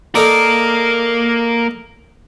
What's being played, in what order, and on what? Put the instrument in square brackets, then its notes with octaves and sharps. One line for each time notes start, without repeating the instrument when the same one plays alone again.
[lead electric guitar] A#3 A#4 [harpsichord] D#4 A4 D5